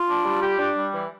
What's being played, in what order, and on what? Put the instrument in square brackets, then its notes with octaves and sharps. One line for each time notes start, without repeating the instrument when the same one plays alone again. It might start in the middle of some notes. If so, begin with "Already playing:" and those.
Already playing: [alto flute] F4
[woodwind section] D4
G3
G4
D4
G3
E3